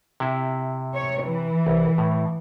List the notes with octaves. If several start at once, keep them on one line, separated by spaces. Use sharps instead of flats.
C3 E4
C#5
E3
C2
A2